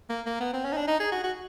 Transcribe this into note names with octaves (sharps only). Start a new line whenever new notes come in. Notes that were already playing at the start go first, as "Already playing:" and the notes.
A#3
A#3
B3
C4
C#4
D#4
D4
D#4
G#4
F#4
F#4